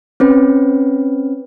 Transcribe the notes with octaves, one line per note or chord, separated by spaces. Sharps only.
C4 C#4 B4